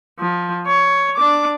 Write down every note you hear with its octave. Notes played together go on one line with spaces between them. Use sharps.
F3
C#5
D4 D6